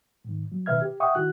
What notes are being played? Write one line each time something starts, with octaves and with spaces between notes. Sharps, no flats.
G#2 D#3
F#3
B2 D#3 B4 E5 F6 G#6
G4
E5 F#5 G5 C#6 D#6
D#3 E4 F#4 F#6